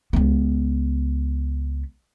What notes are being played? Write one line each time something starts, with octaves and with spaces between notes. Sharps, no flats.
C#2 B3